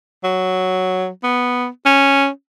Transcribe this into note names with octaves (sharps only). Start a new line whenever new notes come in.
F#3
B3
C#4